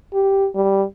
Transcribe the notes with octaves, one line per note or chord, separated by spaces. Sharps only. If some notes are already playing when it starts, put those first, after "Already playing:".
G4
G3